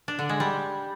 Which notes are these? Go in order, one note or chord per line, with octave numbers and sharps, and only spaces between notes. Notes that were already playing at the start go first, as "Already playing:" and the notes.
D4
D3
G#3
G3